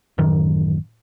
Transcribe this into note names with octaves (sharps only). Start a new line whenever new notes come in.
A1 F#2 D#3